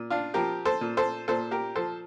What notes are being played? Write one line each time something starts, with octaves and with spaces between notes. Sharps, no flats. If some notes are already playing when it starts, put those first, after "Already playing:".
Already playing: A#2
D4 F4
F3 G4 A#4
A4 C5
A#2
A4 C5
A#2 A4 C5
G4 A#4
F3 A4 C5